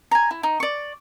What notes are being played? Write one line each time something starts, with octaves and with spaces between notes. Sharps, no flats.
G#5 A#5
E4
D#4
D5 C#6